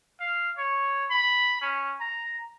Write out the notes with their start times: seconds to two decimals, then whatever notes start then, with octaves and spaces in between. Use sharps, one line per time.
0.20 F5
0.58 C#5
1.10 B5
1.61 C#4
2.00 A#5